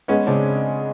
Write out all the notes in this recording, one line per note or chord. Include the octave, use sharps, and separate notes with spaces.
G#3 B3 C#4
C#3 C4 D4